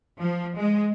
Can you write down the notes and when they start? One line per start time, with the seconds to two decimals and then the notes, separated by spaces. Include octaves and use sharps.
0.21 F3
0.57 G#3